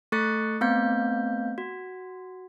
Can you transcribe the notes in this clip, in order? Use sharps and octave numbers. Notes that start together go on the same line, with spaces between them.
A3 A4 C#6 F#6 A6 C#7
A3 B3 C4 F5 G6
F#4